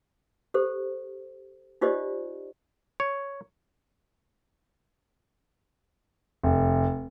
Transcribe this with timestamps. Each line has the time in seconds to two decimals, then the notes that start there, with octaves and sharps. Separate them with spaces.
0.54 G4 A4 C5
1.81 D#4 F4 G4 C5 D5 D#5
3.00 C#5
6.43 F1